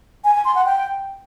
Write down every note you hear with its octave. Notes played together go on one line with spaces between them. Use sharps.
G#5
G#5
C6
F#5
G5